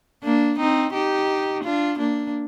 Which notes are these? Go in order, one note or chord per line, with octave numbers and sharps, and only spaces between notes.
A#3 D4
C4 D#4
D#4 G4
D4 F4
A#3 D4